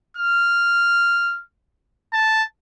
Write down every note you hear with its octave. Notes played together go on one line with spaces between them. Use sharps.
F6
A5